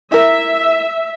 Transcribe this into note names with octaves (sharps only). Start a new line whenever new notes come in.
E4 A#4 E5